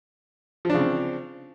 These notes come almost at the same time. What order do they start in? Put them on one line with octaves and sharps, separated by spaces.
F3 D4 C#3 C4